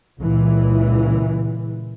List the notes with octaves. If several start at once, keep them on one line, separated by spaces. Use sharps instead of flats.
C#2 A#2 E3